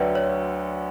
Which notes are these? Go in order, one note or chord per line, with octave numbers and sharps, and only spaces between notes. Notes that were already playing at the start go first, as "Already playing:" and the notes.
Already playing: D2 D3 F#3 B4 C#5 D5 E5 G5
C#5